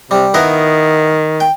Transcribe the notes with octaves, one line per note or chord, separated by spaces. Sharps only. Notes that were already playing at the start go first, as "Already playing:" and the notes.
C3 G3
D#3 B3 E4 A#4
G5